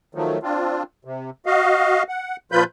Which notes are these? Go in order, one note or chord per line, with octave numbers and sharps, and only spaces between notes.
D#3 F3 F#3 A3
C4 D4 F4
C3
F#4 D#5 F5
F#5
A#2 F3 F4 B4 B5 G6